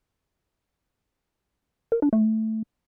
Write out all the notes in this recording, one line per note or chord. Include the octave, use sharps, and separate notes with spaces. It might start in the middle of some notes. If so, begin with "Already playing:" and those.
A#4
D4
A3